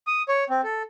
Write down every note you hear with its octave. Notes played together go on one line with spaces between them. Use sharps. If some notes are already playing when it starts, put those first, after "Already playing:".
D#6
C#5
C4
A4